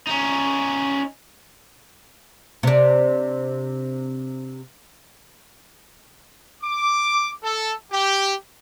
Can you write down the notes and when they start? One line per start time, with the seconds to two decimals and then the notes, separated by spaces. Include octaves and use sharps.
0.07 C#4 D#4
2.63 C3 D4
6.63 D6
7.43 A4
7.92 G4